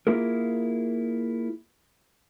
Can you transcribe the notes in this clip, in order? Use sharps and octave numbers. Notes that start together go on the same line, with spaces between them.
A#3 E4 F4 G#4 A#4